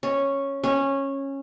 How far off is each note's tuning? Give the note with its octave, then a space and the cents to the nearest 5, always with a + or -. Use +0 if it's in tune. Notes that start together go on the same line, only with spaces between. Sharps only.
C#4 -5
C#4 -15